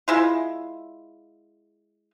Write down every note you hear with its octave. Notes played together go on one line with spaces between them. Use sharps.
G#3 E4 F4